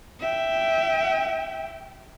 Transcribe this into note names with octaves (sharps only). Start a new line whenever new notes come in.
E5 G5